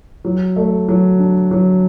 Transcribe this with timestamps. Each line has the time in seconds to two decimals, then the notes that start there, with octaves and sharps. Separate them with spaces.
0.25 F#3
0.56 A3
0.88 F#3
1.19 D4
1.51 F#3